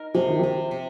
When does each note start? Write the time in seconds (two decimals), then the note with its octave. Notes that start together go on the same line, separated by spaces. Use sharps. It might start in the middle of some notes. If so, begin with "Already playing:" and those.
Already playing: D#4 A#4
0.15 C3 F3
0.28 D#3
0.39 C3 F3
0.71 C3